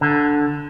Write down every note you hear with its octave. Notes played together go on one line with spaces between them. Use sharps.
D3